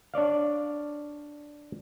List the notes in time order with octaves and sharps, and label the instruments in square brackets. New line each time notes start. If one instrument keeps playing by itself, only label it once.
[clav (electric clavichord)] D4 C#5 D5 F5